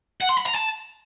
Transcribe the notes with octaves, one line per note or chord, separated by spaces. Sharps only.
F#5
C6
B5
A#5
A5